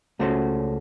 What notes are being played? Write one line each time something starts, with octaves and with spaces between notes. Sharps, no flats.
C#2 A3 C#4 F#4 C5